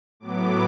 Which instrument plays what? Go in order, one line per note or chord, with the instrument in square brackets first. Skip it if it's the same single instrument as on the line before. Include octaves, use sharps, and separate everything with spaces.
[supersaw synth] A2 F#3 B3 D6